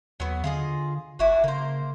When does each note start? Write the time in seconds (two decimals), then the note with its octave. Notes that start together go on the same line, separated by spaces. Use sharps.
0.20 D#2 F#3 B3
0.44 D3 F4 G#4 D#5
1.19 F#1 D4 E4 F#4
1.44 C#3 A#3 C5